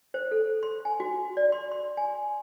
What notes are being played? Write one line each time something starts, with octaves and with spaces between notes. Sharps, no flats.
C5
A4
C6
G#5
F#4
D5
C6
C6
G#5